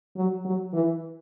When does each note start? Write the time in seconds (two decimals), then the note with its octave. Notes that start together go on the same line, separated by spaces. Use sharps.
0.16 F#3
0.45 F#3
0.73 E3